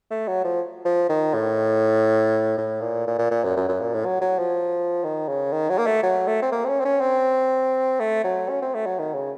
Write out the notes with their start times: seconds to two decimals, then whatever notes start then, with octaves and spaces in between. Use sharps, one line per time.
0.10 A3
0.28 F#3
0.44 F3
0.85 F3
1.09 D#3
1.34 A2
2.58 A2
2.81 A#2
3.07 A#2
3.18 A#2
3.31 A#2
3.44 F#2
3.56 F#2
3.68 F#2
3.80 A#2
3.93 A2
4.05 F#3
4.21 F#3
4.38 F3
5.04 D#3
5.28 C#3
5.52 D#3
5.69 F#3
5.78 A#3
5.86 A3
6.03 F#3
6.27 A3
6.42 C4
6.52 A#3
6.64 C4
6.68 C#4
6.80 C4
6.85 C#4
7.00 C4
8.00 A3
8.24 F#3
8.49 C#4
8.62 C4
8.74 A3
8.86 F#3
8.98 D#3
9.14 C#3